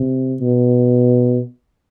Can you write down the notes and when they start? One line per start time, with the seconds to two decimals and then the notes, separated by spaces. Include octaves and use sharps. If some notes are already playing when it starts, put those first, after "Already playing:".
Already playing: C3
0.41 B2